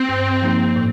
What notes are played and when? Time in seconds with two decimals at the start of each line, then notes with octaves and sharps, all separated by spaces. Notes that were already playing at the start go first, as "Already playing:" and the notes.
Already playing: C4
0.09 G2
0.42 F3 A#3 D#4 G4
0.76 A2